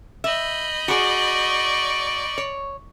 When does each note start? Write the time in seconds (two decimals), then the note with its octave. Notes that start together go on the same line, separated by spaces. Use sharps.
0.24 D#5 E5 B5 G6
0.88 F#4 G#4 D5 C#6
2.38 C#5